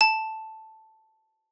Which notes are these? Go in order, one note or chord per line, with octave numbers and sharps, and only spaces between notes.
A5